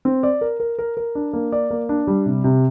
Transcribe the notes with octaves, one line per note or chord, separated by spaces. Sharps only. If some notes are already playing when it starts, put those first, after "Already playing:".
C4
D5
A#4
A#4
A#4
A#4
D4
A#3
D5
A#3
D4
G3
C3
C3